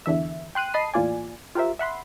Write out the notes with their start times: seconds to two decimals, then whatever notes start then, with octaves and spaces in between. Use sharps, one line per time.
0.06 E2 D3 E3 E5
0.55 G5 C6 F#6 D#7
0.74 D#5 A5 B5 C7 D#7
0.94 E2 A2 A#3 F4 D5 G#5
1.55 F4 G4 A#4 C5 E5
1.79 E5 F#5 B5 C6